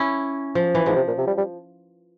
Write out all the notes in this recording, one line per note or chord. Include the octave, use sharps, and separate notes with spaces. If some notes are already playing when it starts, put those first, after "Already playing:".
Already playing: C#4 E4
F3
E3
G#2 F3
C3
A#2
C3
G3
G3